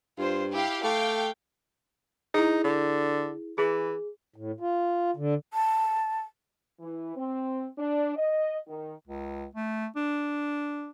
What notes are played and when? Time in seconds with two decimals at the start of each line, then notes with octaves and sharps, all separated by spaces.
0.18 G2 F4 C5
0.53 E4 G4 F5 G5
0.84 A3 F5 G5 D6
2.34 D#4 E4 G#4
2.64 D3
3.58 E3 G#4
4.36 A2
4.60 F4
5.16 D3
5.53 A5
6.80 E3
7.16 C4
7.78 D4
8.16 D#5
8.68 D#3
9.07 C#2
9.55 A3
9.96 D4